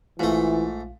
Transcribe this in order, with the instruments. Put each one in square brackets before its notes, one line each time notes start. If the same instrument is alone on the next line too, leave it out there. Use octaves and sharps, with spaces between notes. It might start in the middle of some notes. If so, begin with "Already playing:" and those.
[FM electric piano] A#1 F4 [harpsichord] G#2 A3 [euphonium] E3